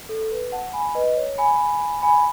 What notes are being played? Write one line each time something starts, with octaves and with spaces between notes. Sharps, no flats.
A4
B4
F#5 A5
G#5 B5
B4 D#5
C#5
G#5 B5
G#5 B5